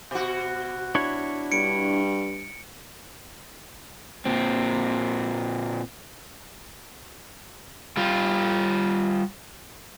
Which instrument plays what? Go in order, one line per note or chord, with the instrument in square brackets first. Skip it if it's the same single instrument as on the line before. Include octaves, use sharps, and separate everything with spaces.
[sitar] B2 F#4
[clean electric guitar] D4 E4 C#5
[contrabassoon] G2 [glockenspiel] C#7 D7
[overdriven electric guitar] A#2 C4
[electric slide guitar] G3 F4